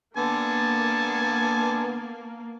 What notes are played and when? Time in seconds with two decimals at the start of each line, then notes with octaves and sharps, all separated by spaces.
0.17 D3 A#3 B3 G#5 A5